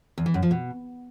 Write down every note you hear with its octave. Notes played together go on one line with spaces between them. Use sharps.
E2
E3
F#2
F3
B2